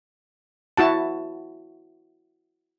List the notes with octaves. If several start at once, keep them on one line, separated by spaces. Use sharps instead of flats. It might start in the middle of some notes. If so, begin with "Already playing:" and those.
E4 F#4 A5